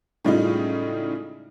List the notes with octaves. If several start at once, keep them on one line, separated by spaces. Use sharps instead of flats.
A2 C#3 G3 G#3 D#4 F4